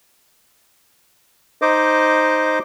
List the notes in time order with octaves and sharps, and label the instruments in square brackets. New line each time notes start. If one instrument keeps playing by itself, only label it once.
[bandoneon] D#4 C5 D#5 D6